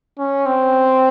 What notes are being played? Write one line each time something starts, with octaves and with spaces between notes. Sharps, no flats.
C#4
C4